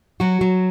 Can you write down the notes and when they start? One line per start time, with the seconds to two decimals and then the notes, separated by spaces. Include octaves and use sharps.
0.20 F#3 F#4
0.41 F#3